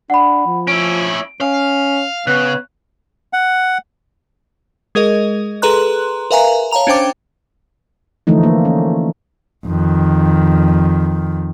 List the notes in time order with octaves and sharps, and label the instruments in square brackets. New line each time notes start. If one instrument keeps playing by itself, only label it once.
[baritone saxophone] D4 [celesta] F#5 B5
[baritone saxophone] F3
[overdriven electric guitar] C#4 E4 [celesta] D7
[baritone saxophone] C#4 [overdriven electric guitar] F5
[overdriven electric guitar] C#3 [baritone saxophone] B3 [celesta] F#6
[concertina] F#5
[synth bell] G#3 G#4 A#4 D#5
G#4 A4 B4 A#5 C6 F#6
A#4 B4 E5 F5 G#5 A#5
C#5 F5 A5 A#5 F7
C#4 D4 C5 G5 D6
[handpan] D3 E3 F3 A3 D#4
A#3
C#4
[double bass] F2 D#3